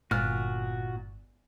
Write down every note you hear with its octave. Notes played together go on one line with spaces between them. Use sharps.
G1 A#2 F#4 F6 F#6